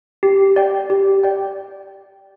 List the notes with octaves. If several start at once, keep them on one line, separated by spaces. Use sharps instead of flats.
G4
D5 G5
G4
D5 G5